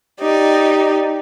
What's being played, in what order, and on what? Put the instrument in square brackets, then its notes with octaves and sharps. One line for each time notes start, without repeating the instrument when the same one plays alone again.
[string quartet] D#4 G4 D5